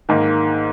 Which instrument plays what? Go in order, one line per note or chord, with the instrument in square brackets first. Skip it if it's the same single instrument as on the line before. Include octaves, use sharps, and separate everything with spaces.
[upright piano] G#2 D#3 A#3